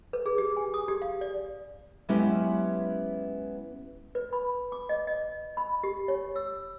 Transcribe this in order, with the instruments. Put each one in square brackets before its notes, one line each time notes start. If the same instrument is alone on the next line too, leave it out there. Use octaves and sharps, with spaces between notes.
[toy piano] B4
G#4
G4
G#5
D#6
G4
F5
D5
[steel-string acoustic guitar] F#3 G#3 B3 C#4 E4 G4
[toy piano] B4
B5
D6
D#5
D#5
B5
G4
C#5
E6